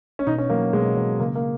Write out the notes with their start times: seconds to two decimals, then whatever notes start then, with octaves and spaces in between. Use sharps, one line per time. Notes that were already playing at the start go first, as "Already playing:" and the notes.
0.19 C#4
0.27 B2 D#4
0.38 C#4
0.50 F#3 A#3
0.73 B2 G#3
0.96 F#3
1.20 C#3 A#3
1.35 A#3